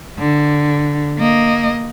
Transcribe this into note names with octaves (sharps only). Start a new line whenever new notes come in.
D3
A#3 D#5